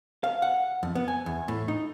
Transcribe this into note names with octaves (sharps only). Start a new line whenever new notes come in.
F5
F#5
F2
B3
G#5
E2
A2
D#4